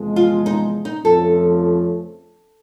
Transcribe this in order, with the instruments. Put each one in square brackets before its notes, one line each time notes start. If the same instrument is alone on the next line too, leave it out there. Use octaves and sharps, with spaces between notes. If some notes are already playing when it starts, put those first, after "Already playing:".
Already playing: [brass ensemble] E2 C3 F3 G#3
[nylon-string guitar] F4
D#4
D#4
[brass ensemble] F2 C#3 F3 A3 [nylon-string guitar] A4